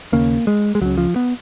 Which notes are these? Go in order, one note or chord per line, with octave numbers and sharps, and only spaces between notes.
D#2 C#3 A#3
G#3
G#3
C#2 C#3 F#3
F3
B3